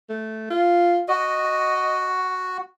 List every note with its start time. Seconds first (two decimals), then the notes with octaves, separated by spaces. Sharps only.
0.09 A3
0.50 F4
1.09 F#4 D#5